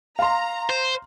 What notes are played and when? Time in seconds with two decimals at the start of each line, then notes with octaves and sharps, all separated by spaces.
0.19 F5 A#5 C6
0.70 C5